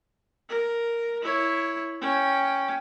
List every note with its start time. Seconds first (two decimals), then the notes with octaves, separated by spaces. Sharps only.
0.49 A#4
1.22 E4 C#5
2.01 C#4 G5